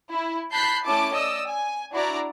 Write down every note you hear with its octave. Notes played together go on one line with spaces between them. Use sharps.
E4
A5 B5 F#6 G6 B6 C7
A3 C#4 E4 A5 D6
D5 D#5 D#6 E6
G#5
D4 E4 F#4 D5 A#5